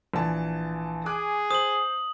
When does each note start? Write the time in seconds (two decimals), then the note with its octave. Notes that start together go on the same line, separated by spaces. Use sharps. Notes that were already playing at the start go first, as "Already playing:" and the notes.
0.14 A#1 E3 A5
1.06 G#4 G#5 D6 F#6
1.51 C5 D#6 F#7